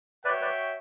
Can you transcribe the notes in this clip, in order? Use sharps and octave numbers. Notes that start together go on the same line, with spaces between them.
F#4 B4 C#5 D5 E5 G5
B4 D5